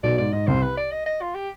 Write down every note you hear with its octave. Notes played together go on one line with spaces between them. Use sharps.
B1 B2 D5
G#2 D5
G#2 D#5
C2 C3 C5
B4
D5
D#5
D#5
F4
G4